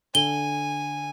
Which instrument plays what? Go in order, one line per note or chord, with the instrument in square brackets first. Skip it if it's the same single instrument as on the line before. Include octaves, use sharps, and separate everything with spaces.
[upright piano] D3 [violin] G#5 [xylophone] G7